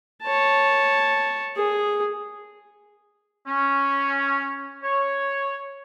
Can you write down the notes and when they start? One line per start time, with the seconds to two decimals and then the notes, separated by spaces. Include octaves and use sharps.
0.23 C#5 A5
1.56 G#4
3.46 C#4
4.83 C#5